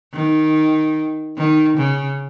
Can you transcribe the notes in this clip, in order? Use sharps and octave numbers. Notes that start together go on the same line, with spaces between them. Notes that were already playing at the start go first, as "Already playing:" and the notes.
D#3
D#3
C#3